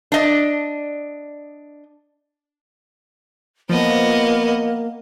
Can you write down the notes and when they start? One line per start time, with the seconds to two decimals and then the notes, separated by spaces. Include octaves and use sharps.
0.12 D4 D#5
3.69 F3 A#3 B3 D#5